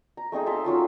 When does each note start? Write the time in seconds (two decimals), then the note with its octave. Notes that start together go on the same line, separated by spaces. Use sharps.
0.17 A#5
0.32 A3 C4 D#4 G#4
0.46 E5 F5 A5 C6
0.65 F#3 C#4 F4 E6